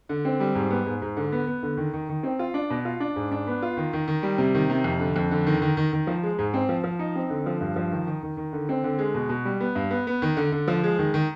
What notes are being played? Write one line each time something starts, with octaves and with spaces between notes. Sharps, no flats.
D3
C4
G3
G#2
B3
G#2
G#2
D3
B3
B3
D3
D#3
D#3
D#3
C4
F4
D4
B2
F4
D4
G#2
D4
B3
F4
D#3
D#3
D#3
G3
C3
D#3
C3
F2
D3
F2
D3
D#3
D#3
D#3
D#3
F3
G#3
G#2
C4
F3
F3
D#4
C4
D3
F3
G2
F3
D#3
D#3
D#3
D#3
D3
C4
D3
G#3
B2
B2
G3
B3
G2
B3
B3
D#3
D3
D3
F3
G#3
D#3
D#3